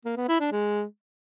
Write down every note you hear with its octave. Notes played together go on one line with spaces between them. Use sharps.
A#3
B3
E4
D4
G#3